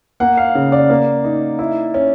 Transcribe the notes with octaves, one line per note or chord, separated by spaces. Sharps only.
A#3 F#5
F5
C#3
D5
A#3
D#4
E4
C#4